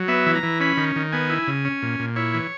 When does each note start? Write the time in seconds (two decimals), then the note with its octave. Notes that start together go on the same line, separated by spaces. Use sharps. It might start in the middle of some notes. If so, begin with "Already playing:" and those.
Already playing: F#3
0.08 B3 E5
0.26 E3
0.35 A#5
0.43 E3
0.60 C#4 B5
0.77 D#3
0.96 D#3
1.12 B3 G#5
1.30 E4
1.47 C#3
1.65 C#4
1.82 A#2
2.00 A#2
2.16 E4 C#5
2.34 E3